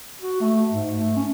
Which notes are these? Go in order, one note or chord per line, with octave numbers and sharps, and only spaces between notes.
F#4
A3
G#2
A3
C#4